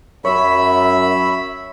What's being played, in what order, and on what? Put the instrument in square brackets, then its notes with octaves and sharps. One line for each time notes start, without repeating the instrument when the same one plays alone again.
[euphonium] F#2 [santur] C#5 [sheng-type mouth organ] E5 B5